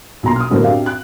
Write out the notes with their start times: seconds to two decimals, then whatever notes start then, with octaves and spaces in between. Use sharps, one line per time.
0.23 B1 A#2 A#5 C6
0.36 D#6 F6
0.51 G1 F#2 A2 A3 A#4 C5
0.62 C4 D4 F#4 G4 E5 F5
0.86 F#6